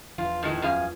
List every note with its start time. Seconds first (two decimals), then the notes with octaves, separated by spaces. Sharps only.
0.18 E2 G2 F3 F4
0.43 A2 D#3 G#3
0.62 F#2 G#4 F5